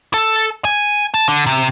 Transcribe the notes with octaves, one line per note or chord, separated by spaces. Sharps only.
A4
G#5
A5
D3
C3